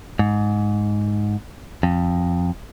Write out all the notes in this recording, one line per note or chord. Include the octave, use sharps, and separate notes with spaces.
G#2
F2